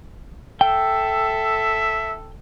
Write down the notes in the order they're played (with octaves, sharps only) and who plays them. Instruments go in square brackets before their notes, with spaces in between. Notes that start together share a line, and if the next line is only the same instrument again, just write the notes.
[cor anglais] A4 [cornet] E5 [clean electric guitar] G5